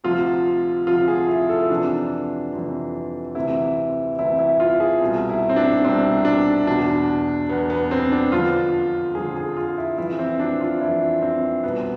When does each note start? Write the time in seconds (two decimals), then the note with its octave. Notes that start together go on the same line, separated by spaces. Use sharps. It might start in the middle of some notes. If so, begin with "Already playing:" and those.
0.04 D2 C3 F3 F4
0.87 D2 C3 F3 F4
1.08 G#4
1.28 E4
1.49 A4
1.70 F2 C3 E3 D4
2.53 F2 C3 E3
3.35 D2 C3 E3 E4
4.19 D2 C3 E3 E4
4.39 E4
4.60 F4
4.80 G#4
5.01 C2 B2
5.29 E4
5.49 C4
5.56 D4
5.83 C2 B2 C4
6.25 D4
6.67 E2 B2 D4
7.49 E2 B2 B3
7.70 B3
7.91 C4
8.12 D4
8.32 F2 D3 F3 F4
9.15 F2 D3 F3 G#4
9.36 G#4
9.57 F4
9.78 E4
9.98 F2 E3 E4
10.19 C4
10.40 D4
10.61 F4
10.81 F2 E3 E4
11.22 C4
11.64 C2 B2 B3